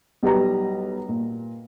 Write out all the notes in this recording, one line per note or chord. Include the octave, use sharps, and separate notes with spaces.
B1 G3 B4 A#5
A#2